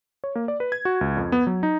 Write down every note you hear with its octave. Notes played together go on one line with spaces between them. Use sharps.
C#5
A#3
D5
B4
G#6
F#4
C#2
F2
B3
F#3
D#4